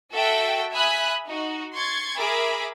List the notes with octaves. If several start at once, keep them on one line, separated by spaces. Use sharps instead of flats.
F#4 A4 E5 G5
E5 G#5 B5 D#6 F#6 B6
D#4 F#4
C6 C#6 G#6 A6
G#4 A#4 E5 B5 D6